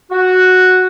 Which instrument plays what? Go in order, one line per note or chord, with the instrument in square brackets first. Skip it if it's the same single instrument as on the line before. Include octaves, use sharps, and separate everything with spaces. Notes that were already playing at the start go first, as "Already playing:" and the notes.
[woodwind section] F#4